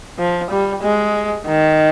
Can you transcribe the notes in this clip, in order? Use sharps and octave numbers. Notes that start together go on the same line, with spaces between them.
F3
G3
G#3
D#3